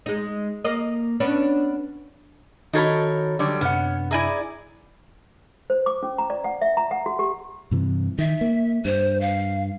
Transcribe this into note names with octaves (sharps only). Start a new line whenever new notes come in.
G#3 D#4
A#3 D#5
B3 C#4 D4
D#3 D#4 F#4 A4 A#4 C#5 B5 F6
D3 F#3 G3
F#2 C3 B3 C#4 D4 F#5
E4 G#4 D5 G#5 A#5
C5
D6
C#4
A#5
D5
F#5
E5
A#5
F#5
F#4
G4
G2 C3 E3
D#3 E5
A#3
G2 C5
F5